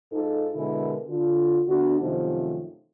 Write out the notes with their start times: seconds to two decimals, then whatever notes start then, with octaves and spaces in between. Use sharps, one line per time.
0.11 G#2 D#4 F4 A4
0.55 B2 D3 G#3 B3 E4 A#4
1.08 D3 F4
1.66 D2 D3 B3 D4 F#4
2.00 F#2 C3 D#3 F3 A3 D#4